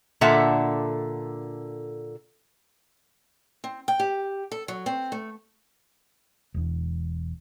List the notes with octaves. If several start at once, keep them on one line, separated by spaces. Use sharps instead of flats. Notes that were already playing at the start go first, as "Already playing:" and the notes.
A#2 D3 A4 E5 F#5
C4
G5
G4
A4
F#3
C4
A3
E1 E2